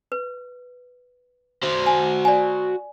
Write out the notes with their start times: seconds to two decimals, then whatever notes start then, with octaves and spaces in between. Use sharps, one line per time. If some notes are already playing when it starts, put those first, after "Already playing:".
0.12 B4
1.63 F#4 C5
1.86 G#5
2.25 D5 G#5